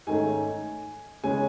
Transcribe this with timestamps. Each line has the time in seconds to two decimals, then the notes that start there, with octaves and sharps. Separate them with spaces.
0.07 G#2 D#3 A3 C#4 G#5
1.24 C#3 G#3 C#4 G#5